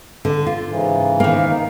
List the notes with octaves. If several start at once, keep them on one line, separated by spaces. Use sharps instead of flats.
D3
F4
G#2 C#3 E3
D#3 A#3
D#4